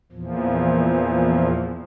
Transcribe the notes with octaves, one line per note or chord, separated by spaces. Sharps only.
E2 A#2 F3